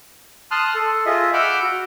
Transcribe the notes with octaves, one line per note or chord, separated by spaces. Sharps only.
A5 C6 D#6 F6 F#6
A4
F4 G#4 D#5 E5
F#5 B5 D6 E6 F6 G6
F#4